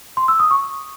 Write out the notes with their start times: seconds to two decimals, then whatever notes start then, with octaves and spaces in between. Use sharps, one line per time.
0.17 C6
0.28 E6
0.39 D#6
0.51 C#6